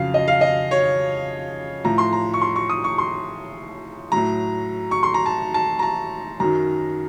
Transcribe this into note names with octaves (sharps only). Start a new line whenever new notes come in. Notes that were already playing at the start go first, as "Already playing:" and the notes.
Already playing: F2 C#3 F#3 F5
D#5
F5
D#5
C#5
A2 F3 A#5
C6
A#5
C#6
C6
C#6
D#6
C#6
C6
A2 F#3 A#5
C#6
C6
A#5
A5
A5
A#5
A5
F#2 D#3 F#3 A#5